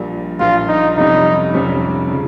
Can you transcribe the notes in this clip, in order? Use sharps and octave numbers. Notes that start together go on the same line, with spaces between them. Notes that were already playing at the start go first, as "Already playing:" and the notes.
Already playing: A#1 A#2 G3
A#1 A#2 G3 F4
D#4
F1 F2 C3 G3 C#4 D#4
F1 F2 C3 G3 C#4
C#3 F3